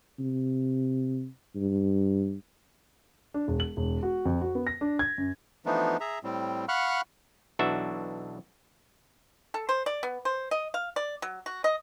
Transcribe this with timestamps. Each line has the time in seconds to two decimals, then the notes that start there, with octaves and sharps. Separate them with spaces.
0.19 C3
1.55 G2
3.34 D4
3.48 E1
3.60 F#7
3.77 E1
4.03 F#4
4.25 F2
4.41 F#4
4.55 B3
4.67 A#6
4.81 D4
4.99 G#6
5.18 F#2
5.66 E3 F3 A3 B3 D4 D#4
6.00 G#4 E5 A#5
6.23 A2 G3 C4
6.68 F5 F#5 B5 C#6 F6 F#6
7.59 B1 E3 D4 F#4 E5
9.54 A4
9.69 C5
9.86 D5
10.03 B3
10.25 C5
10.51 D#5
10.74 F5
10.96 D5
11.22 F#3
11.46 F#4
11.64 D#5